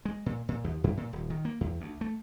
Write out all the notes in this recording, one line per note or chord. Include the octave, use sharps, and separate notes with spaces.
G#3
A#2
A#2
D#2
F#2
A#2
D#1
D#3
A#3
E2
D2
A3